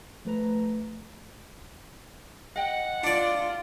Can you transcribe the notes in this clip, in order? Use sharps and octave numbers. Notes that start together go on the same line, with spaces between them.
F3 A3 B4 A#5
D#5 F#5 G5
D4 F4 D5